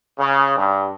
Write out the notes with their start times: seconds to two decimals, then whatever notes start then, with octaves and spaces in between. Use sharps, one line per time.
0.19 C#3
0.57 G2